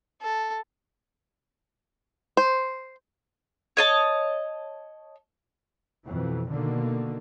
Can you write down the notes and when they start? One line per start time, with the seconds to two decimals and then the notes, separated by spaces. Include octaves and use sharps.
0.22 A4
2.37 C5
3.77 C#5 D#5 A5
6.07 F2 B2 E3
6.51 B2 D3 D#3 A#3